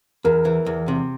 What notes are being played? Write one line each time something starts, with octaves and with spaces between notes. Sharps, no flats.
E2 A#4
E3
E2
C3